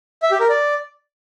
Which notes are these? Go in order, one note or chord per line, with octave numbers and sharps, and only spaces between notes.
E5
G4
A#4
D5